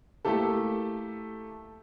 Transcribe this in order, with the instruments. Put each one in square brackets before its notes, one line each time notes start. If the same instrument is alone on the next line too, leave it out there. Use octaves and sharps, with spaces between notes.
[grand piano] A3 A#3 E4 G4 A4